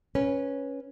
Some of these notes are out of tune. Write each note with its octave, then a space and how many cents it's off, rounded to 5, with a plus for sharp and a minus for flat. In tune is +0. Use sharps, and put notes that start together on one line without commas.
C#4 +0 B4 -10